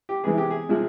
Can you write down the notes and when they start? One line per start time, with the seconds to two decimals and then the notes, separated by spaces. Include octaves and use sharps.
0.09 G4
0.24 C3 E3 G#3 B3 G#4
0.38 G4
0.51 G#4
0.69 C3 F3 G#3